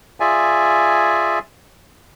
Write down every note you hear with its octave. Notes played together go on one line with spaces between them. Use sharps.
F4 G#4 D5 E5 G#5